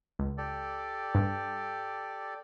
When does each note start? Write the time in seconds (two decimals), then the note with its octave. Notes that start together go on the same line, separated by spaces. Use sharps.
0.19 C#2
0.38 G4 A4 D5
1.15 G2